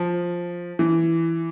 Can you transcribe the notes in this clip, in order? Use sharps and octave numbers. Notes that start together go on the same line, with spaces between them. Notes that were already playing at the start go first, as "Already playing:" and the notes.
Already playing: F3
E3